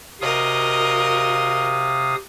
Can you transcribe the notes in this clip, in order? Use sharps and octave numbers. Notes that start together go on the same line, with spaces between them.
C3 F#4 A#4 D#5 F5 D#6